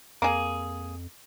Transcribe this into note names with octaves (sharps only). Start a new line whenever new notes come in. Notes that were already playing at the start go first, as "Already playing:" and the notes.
F2 A#3 G#4